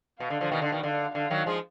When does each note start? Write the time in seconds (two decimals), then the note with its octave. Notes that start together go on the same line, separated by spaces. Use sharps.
0.20 B2 F5
0.30 D3
0.41 D3 F3
0.52 B2 D#3
0.62 D3
0.72 B2 D#3
0.83 D3 F5
1.15 D3 F5
1.30 D#3 F#3
1.46 F3 G#3